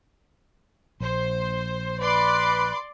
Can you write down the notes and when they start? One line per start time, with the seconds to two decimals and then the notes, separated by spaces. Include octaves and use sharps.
1.00 A#1 C5
2.00 B4 D5 C6 D6